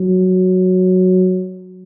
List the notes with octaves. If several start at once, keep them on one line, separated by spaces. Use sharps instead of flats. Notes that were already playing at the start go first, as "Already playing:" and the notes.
Already playing: F#3